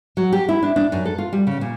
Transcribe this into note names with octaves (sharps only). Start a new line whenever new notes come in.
F#3
G4
E4
D4
D4
F#2
A4
F4
G3
C#3
A#2